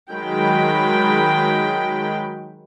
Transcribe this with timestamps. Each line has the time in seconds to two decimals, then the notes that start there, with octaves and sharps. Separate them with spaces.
0.11 D#3 F#3 G#3 G5 B5